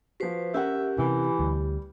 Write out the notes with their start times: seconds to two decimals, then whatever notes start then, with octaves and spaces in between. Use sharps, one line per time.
0.20 F3 F#4 B4 C5
0.54 C#4 G4 A#4 E5 F#5
0.99 C3 E3
1.39 D2 G3